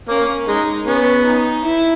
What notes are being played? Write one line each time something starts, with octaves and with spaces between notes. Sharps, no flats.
A#3 C#4
G#3 D#4
B3 C#4
D#4
E4